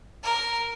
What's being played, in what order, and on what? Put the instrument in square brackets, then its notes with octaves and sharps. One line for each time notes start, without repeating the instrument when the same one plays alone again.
[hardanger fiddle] A#4